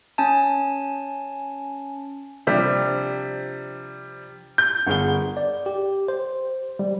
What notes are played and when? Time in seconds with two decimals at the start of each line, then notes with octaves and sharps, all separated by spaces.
0.18 C#4 G#5 A5
2.47 C3 F3 G3 D4 G4
4.58 G6
4.87 G1 G#4 A#4 F#5 G7
5.37 D5
5.66 G4
6.08 C5
6.79 G3